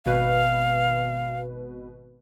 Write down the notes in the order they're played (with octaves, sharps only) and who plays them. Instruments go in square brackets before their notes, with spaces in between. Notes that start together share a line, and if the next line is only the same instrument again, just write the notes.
[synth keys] G#1 B2 B4 [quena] F5